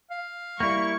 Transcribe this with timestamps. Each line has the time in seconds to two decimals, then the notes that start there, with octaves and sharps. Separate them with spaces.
0.11 F5
0.60 G3 A#3 E4 C#6